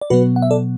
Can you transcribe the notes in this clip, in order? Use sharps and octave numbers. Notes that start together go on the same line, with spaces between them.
D5
B2 F#3 B3 F#4 B4
F#5
E5
A4 D5